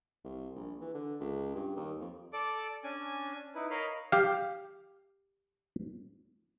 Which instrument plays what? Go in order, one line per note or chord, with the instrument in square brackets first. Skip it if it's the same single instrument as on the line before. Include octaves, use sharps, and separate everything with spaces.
[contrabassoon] C2
A#1
E3
D3
C#2
G2
D#2
F2
[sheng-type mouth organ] A4 D5 D6
C#4 D4 G#5
D#4 E4 B4
A#4 C#5 D#5 F5 B5
[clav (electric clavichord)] G4 F5